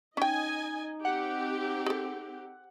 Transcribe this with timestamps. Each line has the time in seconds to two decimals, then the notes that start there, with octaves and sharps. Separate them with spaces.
0.17 C#4 D#4 D#5 G5 G#5
1.05 C4 G4 F#5
1.86 G#4 A4